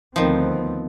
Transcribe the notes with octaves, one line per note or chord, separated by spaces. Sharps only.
D2 D#3 F3 B3 C4